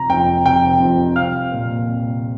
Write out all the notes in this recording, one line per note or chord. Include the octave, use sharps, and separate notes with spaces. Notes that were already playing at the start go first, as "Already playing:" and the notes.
Already playing: F1 A#5
F2 F3 G5
F1 G5
F2 F3
C2 F5 F6
A#2 A#3
C2